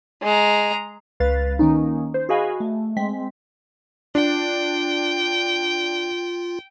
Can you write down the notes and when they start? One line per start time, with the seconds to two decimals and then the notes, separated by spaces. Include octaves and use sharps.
0.23 G#3 A#5
1.20 C#2 B4 F5 A6
1.59 D#3 A#3 C#4 D#4
2.14 C5
2.29 F#4 G#4 D#5 F5 G#5 B5
2.60 A3
2.96 G#3 C4 B6
4.15 D4 F4 G5